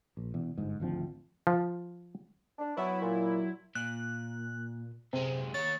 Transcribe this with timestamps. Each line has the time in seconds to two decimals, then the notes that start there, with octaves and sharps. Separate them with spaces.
0.17 A#1
0.34 E1 E2
0.58 G1 G#2
0.80 G#1 D2 F3 C4
1.47 F3
2.59 D4
2.77 F#3 B3 E4 B4 C#5
3.02 A#2
3.75 A#2 F#6
5.13 F#2 C3 G#3
5.54 D#2 C#5 A6